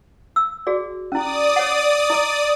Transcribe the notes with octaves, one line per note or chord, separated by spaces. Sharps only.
E6
F#4 G#4 D5
C#4 E4 D5 D#6
C#5 F#5
E4 D#5 D6